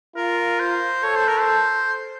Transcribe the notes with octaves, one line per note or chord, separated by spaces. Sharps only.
F4 A#4
C5
A4 C#5
C5
A#4
C5